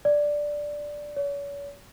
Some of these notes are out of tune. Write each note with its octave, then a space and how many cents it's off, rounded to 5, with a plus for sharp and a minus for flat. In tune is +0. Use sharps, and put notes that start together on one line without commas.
D5 +0
C#5 +40